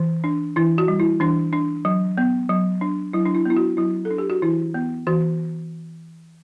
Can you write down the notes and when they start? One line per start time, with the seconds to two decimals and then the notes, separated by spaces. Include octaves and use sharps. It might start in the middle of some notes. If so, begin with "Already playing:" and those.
Already playing: E3
0.24 D4
0.56 E3 E4
0.78 F#4
0.88 G3
1.00 E4
1.20 E3 D4
1.53 D4
1.85 F#3
2.18 B3
2.49 F#3
2.81 D4
3.13 F#3 E4
3.26 D4
3.35 E4
3.45 B3 E4
3.57 F#4
3.77 F#3 E4
4.05 A4
4.11 D4
4.18 G4
4.30 F#4
4.42 E3 E4
4.74 B3
5.07 E3 F#4